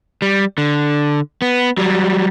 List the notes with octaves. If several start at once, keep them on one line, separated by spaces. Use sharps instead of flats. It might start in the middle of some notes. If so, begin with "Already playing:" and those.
G3
D3
B3
F#3 G3